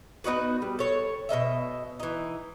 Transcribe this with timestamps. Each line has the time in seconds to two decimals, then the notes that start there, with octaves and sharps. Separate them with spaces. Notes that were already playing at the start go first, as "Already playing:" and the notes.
0.24 B3 D#4 F#4 B4
0.62 G3
0.79 A4 C#5
1.29 B2 A#3 D#5 E5
2.00 E3 D#4